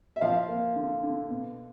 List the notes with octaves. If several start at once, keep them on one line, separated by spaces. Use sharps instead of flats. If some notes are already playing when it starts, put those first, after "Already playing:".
E5
F3 F5
A#3
D3
D3
B2